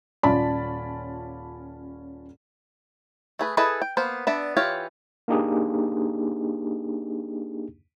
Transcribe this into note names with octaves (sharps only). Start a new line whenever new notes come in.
D#1 C#4 F4 D5 A5 B5
A3 G#4 B4
E4 G#4 A4 B4 D#5
G5
A#3 B3 C5
B3 D4 E5
E3 F4 G4 C#5
A#3 D4 D#4 G4 G#4